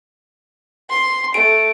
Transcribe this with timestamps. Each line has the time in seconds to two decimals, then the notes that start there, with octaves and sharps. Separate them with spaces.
0.90 C6
1.34 A3 D7